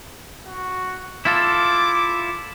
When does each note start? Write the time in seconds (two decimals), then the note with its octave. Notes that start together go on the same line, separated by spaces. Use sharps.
0.45 F#4
1.25 E4 F4 A4 D6